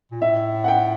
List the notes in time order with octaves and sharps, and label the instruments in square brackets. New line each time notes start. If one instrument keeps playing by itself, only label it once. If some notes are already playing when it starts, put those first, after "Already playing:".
[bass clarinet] A#2
[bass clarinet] A2 [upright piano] E5
[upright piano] F#5
G5